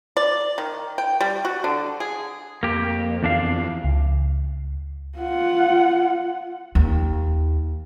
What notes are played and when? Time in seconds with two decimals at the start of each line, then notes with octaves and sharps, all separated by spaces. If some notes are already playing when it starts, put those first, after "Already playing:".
0.17 D5
0.58 D#3
0.98 G5
1.21 G3
1.45 F#4
1.64 D3
2.00 G#4
2.63 F2 A#3 G4
3.23 E2 D4 F5
3.84 C#2
5.18 F4 F#5
6.75 D#2